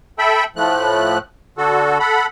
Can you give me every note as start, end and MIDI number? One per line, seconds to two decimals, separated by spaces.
0.19 0.44 69
0.19 0.44 76
0.19 0.44 79
0.19 0.44 83
0.56 1.18 45
0.56 1.18 53
0.56 1.18 57
0.56 1.18 90
1.58 1.98 50
1.58 1.98 66
1.58 1.98 69
2.00 2.26 69
2.00 2.26 78
2.00 2.26 83